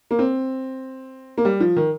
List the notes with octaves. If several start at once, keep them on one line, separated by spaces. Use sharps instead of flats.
A#3
C4
A#3
G3
F3
D#3